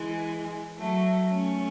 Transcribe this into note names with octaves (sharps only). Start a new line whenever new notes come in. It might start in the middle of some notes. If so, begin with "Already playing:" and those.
Already playing: E3 G#3
F#3 A3
A3 C#4